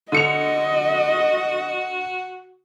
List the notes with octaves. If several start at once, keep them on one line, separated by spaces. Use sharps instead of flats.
D3 F#4 D#5 C#7 F7